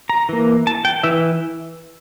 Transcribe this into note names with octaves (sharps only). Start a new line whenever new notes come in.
A#5
E3 A#3
A5
G5
E3 E5